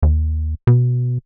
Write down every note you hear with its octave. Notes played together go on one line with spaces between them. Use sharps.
D#2
B2